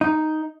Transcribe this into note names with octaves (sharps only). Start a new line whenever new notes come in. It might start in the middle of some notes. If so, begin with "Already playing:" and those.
D#4